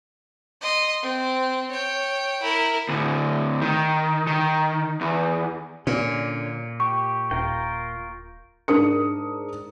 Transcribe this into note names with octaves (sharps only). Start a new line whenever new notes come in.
D#5 C6
C4
C#5 G5
E4 A#4
D2 A2
D#3
D#3
E2
A#2 D3 C#4
G4 C#6
D#1 F4 A#4 G5
G#2 D4 A#4 D#6 C#7